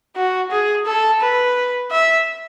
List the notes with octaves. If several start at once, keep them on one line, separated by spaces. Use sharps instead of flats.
F#4
G#4
A4
B4
E5